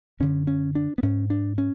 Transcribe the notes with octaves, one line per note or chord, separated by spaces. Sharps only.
F#2 D3 C#4
C#4
D4
B3
G#2 C#4
D4
C#4